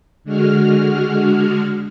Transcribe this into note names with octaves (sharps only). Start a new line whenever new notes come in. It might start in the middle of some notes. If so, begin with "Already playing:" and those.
D3 G#3 F#4 F6